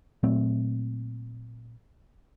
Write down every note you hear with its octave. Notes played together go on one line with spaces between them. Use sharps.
A#2 F#3 A3 C4